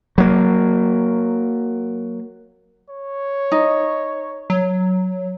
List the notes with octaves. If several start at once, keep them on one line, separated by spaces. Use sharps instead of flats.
F#3 A#3
C#5
D#4
F#3